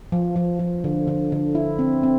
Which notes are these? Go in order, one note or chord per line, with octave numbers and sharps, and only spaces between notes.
F3
F3
F3
D3
D3
D3
E4
C4
C4